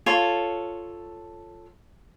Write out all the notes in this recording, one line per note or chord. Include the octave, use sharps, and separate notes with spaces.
F4 A4 C#5